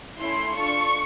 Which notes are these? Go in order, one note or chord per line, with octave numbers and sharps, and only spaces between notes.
A3 C#4 E4 C6
D4 F4 A4 C#6